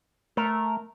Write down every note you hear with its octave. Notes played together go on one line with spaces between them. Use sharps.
A3 A#4